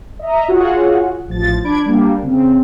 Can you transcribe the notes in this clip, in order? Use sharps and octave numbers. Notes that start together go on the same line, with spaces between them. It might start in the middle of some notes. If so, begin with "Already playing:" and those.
D#5 E5 A#5
F4 F#4 G#4 C#5 F#5
A1 F3 A6
D4 B5 G#6 D7
G3 A#3 D4
C#3 C4